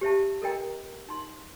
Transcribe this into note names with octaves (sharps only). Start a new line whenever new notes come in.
G4 C5 E5 A5
A4 A#4 D#5 G5 A#5
D#4 C6